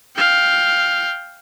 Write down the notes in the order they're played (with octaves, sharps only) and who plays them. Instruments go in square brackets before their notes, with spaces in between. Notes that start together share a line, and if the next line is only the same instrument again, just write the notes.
[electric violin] F5 G5